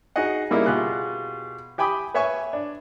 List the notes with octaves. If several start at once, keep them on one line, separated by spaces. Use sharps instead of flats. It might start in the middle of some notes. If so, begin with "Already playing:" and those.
D#4 F#4 G#4 D#5 F#5
C#3 G3 A#3 D#4 E4 A#4
B2 F4 G4 G#4 F#6
G4 G5 G#5 B5 D6 D#6
B4 C#5 E5 G#5 C#6
D4